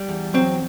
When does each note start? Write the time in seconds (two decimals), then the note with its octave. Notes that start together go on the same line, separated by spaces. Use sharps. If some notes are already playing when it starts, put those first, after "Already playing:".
Already playing: G3
0.09 E2
0.34 F#3 C4